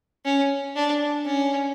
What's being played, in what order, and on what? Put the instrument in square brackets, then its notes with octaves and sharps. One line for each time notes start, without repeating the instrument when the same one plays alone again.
[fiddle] C#4
D4
C#4